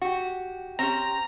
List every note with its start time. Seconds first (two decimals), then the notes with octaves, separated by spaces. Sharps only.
0.02 F#4 G4
0.79 C4 C#4 G4 A#5